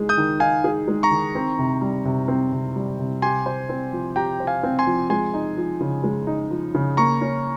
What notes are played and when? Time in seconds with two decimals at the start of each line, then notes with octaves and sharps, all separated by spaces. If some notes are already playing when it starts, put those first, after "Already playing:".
Already playing: G#3 D#4 G#4
0.09 D#6 G6
0.18 D#3
0.40 D#4 F5 G#5
0.64 G#4
0.88 G#3
1.03 A#5 C#6
1.11 D#3
1.35 C4
1.59 C3
1.81 G3
2.05 C3
2.28 C4
2.52 C3
2.76 G3
2.99 C3
3.22 G4 G#5 C6
3.46 C5
3.69 C4
3.93 F3
4.16 G4 G5 A#5
4.40 C5
4.47 F5 G#5
4.63 C4
4.79 G#5 C6
4.87 F3
5.10 G#3 G#5 C6
5.34 D#4
5.57 F3
5.81 C#3
6.03 G#3
6.27 D#4
6.51 F3
6.75 C#3
6.97 A#3 A#5 C#6
7.21 C#4